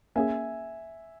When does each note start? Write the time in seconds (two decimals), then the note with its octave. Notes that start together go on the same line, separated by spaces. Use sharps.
0.16 A#3 C#4 G#4 E5 G#5